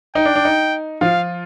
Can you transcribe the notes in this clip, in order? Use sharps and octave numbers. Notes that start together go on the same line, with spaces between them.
D#4 G5
D4
D4
D#4
F3 F4 F5